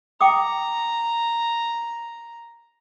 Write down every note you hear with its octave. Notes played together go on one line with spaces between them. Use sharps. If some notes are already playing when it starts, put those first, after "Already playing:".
G5 A#5 D6 D#6